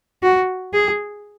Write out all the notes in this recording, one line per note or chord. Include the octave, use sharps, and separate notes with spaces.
F#4
G#4